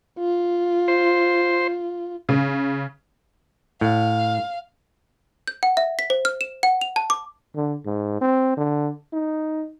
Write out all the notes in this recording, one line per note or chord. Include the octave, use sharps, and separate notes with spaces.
F4
C5
C#3
A2 F5
G6
F#5
E5
B6
C5
F6
E7
F#5
F7
A5
D6
D3
G#2
C4
D3
D#4